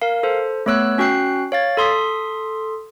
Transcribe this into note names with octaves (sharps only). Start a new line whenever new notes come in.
A#4 F5
A4 C5
A3 B3 C#5 E6 F#6
C#4 F#4 G5 F#6 C7
C#5 F5 A6
A4 C6 D#6 B6